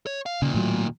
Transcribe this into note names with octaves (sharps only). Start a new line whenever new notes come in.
C#5
F5
D#2 A#2 C#3
A2 F#3